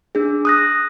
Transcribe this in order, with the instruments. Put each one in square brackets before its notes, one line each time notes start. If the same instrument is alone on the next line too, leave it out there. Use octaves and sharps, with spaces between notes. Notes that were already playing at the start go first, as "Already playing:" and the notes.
[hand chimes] D4 G#4
D#6 F#6 A#6